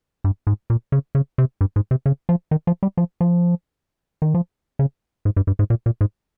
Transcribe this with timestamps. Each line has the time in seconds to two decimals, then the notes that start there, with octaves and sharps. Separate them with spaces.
0.24 G2
0.47 G#2
0.70 A#2
0.92 C#3
1.15 C#3
1.38 C3
1.61 G2
1.76 G#2
1.91 C3
2.06 C#3
2.29 F3
2.51 D#3
2.67 F3
2.83 G3
2.97 F3
3.21 F3
4.22 D#3
4.34 F3
4.79 C#3
5.25 G#2
5.36 G2
5.47 G2
5.59 G#2
5.70 A#2
5.86 A#2
6.01 G#2